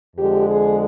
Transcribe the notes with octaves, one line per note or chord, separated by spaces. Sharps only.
F2 D3 G#3 G4
G#4